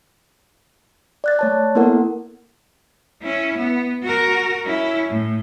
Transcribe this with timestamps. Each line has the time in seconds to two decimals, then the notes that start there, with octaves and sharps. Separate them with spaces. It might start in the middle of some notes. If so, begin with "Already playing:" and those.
1.24 D5 F#6 A6
1.39 A3 C#5 A5
1.75 A#3 B3 E4 A4 A#4 F#5
3.22 C#4 E4
3.57 B3
4.03 F#4 A#4
4.66 C#4 E4
5.09 A2